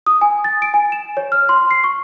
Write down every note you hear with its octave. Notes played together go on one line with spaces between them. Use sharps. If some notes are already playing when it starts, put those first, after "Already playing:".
D#6
G#5
A6
D7
G#5
E7
C#5
F6
C6
C7
C#6